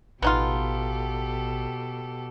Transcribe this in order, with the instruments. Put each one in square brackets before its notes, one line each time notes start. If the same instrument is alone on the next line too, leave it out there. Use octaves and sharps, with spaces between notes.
[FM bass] A1 [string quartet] B2 G4 A4 [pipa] B3 D#4 F4